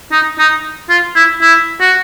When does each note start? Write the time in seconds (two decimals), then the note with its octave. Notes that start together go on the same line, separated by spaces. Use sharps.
0.12 D#4
0.39 D#4
0.89 F4
1.15 E4
1.41 E4
1.80 F#4